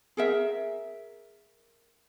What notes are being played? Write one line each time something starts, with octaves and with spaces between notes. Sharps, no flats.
G#4 A#4 E5